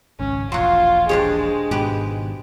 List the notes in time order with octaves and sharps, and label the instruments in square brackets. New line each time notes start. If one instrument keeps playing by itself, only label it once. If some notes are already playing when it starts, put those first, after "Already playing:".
[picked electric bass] G#1 C#2 [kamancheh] C#4
[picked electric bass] E1 A#1 [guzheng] F#3 F#4 [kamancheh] F4 [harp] C6 G#6
[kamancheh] G#3 [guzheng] D4 G4 C#5 [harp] G#4 C5
[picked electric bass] G#1 G#2 B2 [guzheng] G4 B4